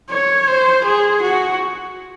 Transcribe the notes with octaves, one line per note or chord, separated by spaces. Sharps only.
C#5
C5
G#4
F#4